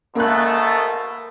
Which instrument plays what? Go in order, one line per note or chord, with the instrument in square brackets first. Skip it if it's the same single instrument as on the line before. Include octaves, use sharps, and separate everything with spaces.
[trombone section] G#2 B2 A3 [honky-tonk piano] A#3 F#6